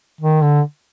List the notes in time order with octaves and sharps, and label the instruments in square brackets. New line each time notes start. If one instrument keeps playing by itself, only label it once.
[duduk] D#3
D3